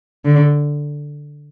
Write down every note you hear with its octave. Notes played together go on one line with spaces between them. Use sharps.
D3